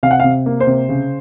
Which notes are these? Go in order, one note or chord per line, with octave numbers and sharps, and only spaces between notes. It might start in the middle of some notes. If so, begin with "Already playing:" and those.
C3 F5
F#5
C3 F5
A#3
C5
C3
C#3